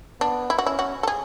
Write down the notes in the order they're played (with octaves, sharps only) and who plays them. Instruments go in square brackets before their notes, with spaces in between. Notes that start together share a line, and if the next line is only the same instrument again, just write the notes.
[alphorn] B3 [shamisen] D4
[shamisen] E4
F#4
[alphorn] C#4 [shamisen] E4
[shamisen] F#4
A4
G#4